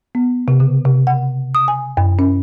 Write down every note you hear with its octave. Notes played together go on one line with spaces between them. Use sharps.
B3
C3
C#3
C3
F#5
D#6
G#5
F#2
C#4